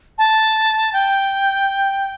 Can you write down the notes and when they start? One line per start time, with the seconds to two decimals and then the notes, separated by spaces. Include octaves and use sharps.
0.18 A5
0.93 G5